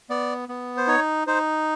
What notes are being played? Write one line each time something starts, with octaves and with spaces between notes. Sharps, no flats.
B3 D5
B3
C5
D#4 C#5
D#4 C5